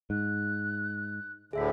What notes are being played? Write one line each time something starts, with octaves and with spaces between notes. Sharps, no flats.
G#2 F#6
D2 A2 D3 G#4 E5 B6